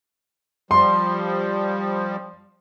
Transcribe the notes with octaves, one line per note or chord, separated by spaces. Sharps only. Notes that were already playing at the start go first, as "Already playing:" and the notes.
F3 G3 C6